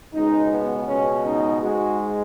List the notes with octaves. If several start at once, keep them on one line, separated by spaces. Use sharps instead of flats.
C#2 B2 G#3 D#4
B3
C#2 B2 G#3 C#4
D#4
G#2 G#3 F#4